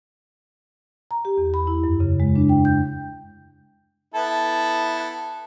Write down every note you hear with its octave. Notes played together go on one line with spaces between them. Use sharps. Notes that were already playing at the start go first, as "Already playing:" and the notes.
A#5
G4
E2
B5
E4
F#2
C#3
G#3
D4
G5
G6
B3 E4 A4